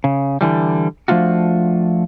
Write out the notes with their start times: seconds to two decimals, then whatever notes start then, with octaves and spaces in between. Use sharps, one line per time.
0.04 C#3
0.41 D3 E3 G3
1.08 F3 A3 D4 F4 F#4